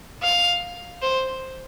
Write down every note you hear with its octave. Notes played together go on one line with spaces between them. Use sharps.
F5
C5